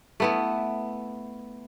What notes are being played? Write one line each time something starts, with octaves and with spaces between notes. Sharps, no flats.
A3 B3 E4